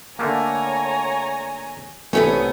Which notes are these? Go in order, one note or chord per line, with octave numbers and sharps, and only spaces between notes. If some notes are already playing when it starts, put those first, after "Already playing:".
D3 A3 A#3 C#5 G#5 A#5
C2 A2 C3 A3 B3 C#4 D#6